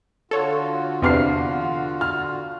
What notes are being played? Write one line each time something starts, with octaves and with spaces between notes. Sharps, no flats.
D3 F4 F#4 A4 C#5
E2 C3 B3 D4 F6 C7
F6